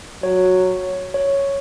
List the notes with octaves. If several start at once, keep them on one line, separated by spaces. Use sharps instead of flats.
F#3 C#5
C#5